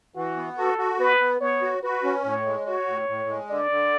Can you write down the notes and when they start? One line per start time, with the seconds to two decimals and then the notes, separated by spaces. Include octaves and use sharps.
0.15 E3 F#4
0.37 B3
0.58 F#4 A4
0.78 F#4
0.99 B3 B4
1.20 B3
1.41 B3 C#5
1.62 F#4
1.83 F#4 B4
2.03 C#4
2.25 A2 C#5
2.45 G#3
2.66 F#4 C#5
2.87 A2
3.08 A2
3.29 G#3
3.50 D3 D5
3.71 D3